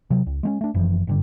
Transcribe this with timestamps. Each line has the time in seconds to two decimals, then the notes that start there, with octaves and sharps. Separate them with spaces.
0.10 C3 F#3
0.27 C#2
0.43 G#3 A3 C#4
0.61 A3 D4
0.74 F#1 F#2 E3 F3
1.07 F#1 G2 D3